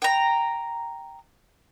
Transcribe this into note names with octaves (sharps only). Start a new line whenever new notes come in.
G5 A#5